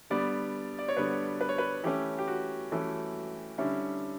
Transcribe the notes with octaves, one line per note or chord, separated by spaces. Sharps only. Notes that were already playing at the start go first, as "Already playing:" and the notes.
D3 G3 B3 D5
D5
C#5
D3 G3 B3 B4
B4
C#5
B4
E3 A3 C#4 G4
G4
F#4
E3 A3 C#4
D3 G3 C#4 E4